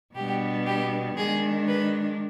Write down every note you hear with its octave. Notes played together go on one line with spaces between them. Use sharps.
B2 G3 B3 D4 G4
G4
D#3 G#3 D4 G#4
B4